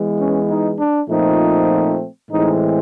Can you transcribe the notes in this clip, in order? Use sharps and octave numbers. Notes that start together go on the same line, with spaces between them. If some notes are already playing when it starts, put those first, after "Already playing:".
Already playing: E3 G#3 B3
C#4
D#4
D4
A#2 F3 A3 C4 D#4
A2 E3 G#3 C4 D#4